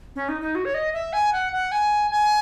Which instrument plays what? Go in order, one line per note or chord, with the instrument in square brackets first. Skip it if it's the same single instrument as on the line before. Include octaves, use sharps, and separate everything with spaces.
[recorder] C#4
D#4
D#4
F#4
C#5
D#5
E5
G#5
F#5
F#5
G#5
G#5